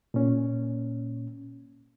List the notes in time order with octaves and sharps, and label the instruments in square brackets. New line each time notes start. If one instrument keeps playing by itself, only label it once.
[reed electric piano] A#2 C#4